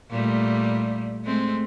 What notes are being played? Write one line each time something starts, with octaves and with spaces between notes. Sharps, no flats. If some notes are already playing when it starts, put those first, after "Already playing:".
A#2 G3 A3
G#3 A3 C4